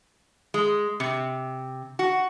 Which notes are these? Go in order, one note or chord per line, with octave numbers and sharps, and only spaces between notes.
G#3
C3
F#4